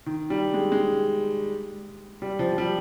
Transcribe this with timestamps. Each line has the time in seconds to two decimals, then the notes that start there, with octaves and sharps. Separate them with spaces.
0.06 D#3
0.30 G3
0.54 G#3
0.72 G#3
2.22 G3
2.39 F3
2.52 F3
2.58 G3